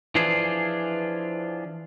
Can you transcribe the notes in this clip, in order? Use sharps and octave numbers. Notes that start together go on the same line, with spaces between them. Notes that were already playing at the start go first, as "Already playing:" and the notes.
E3 F3 D4 F4 G#4